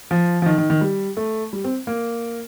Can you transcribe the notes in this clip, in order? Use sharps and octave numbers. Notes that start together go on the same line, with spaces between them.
F3
F3
D#3
D#3
D#3
G3
A3
G3
C4
A#3